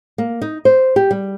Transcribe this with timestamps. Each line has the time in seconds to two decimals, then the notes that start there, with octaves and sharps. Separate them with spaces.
0.18 A#3
0.42 D#4
0.65 C5
0.96 G4
1.11 G3